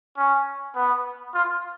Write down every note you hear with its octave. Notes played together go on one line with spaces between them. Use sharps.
C#4
B3
F4